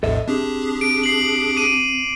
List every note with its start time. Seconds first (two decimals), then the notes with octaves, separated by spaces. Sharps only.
0.03 A#1 E2 A2 A4 D#5 E5
0.28 C4 D4 G4 G#4
0.81 D7
1.03 C7 F#7
1.57 D6 D7 D#7